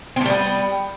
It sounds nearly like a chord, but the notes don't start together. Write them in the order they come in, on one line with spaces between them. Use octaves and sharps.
C4 A3 G3 B3